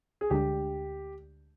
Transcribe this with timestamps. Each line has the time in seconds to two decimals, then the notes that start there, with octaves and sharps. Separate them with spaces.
0.21 G#4
0.30 D2 D3 G#3 D4 G4